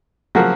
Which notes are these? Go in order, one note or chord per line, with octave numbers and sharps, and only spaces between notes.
C#3 F3 F#3 A#3 F#4